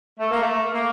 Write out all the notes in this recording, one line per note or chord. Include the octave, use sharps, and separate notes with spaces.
A3
A#3
A3
A#3